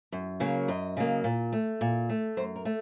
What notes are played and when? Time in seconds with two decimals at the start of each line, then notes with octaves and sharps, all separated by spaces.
0.12 F#2
0.40 C#3 F#3 A#3
0.68 F#2 D#5
0.97 C#3 F#3 A#3
1.24 A#2
1.53 A3
1.81 A#2
2.09 A3
2.37 F#2 C5
2.56 A#4
2.65 A3